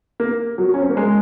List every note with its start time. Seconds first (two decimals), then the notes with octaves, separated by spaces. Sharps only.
0.20 A#3
0.58 F#3
0.74 C#4
0.82 C4
0.90 A#3
0.97 G#3